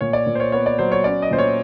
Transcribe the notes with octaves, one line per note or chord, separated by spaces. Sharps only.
A#2 C#5
D5
A#2
C5
C#5
B3 C#5
D5
F#3 C5
C#5
C#4 D5
D#5
A#2 C5
C#5